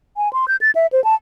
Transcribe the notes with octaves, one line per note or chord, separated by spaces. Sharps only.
G#5
C6
G6
A6
E5
C5
A5